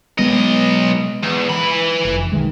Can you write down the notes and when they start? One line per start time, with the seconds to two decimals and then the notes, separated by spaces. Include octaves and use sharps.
0.19 B1 G#3 B3 D#5
1.23 E2
1.49 E3 B5
2.05 F1
2.32 B1 D#3 G#3